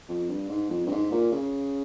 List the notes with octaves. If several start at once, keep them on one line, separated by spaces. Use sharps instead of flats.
F2
G2
G#2
F2
G2
G#2
A#2
C#3